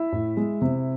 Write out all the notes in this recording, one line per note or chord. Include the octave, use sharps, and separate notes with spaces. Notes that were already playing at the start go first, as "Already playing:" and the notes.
Already playing: E4 E5
A2
G#3
C3